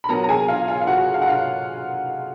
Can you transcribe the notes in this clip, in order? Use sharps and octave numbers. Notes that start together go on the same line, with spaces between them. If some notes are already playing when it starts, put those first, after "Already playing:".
B5
A#2 F#3 B3 A#4 A#5
A#5
G#4 G#5
F4 F5
F4 F5
F5
F#4 F#5
F5
F#5
F4 F5